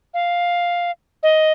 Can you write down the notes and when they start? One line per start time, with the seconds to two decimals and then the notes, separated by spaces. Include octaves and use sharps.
0.14 F5
1.23 D#5